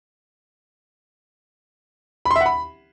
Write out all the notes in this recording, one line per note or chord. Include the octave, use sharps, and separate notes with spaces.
B5
C6
E5
F#5
B5